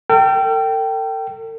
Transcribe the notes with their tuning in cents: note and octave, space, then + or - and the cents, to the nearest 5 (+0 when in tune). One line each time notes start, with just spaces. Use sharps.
A4 +45 G5 -15